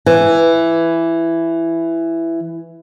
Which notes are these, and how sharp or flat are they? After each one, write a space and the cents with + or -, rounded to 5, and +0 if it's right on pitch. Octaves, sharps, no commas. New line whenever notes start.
E3 +10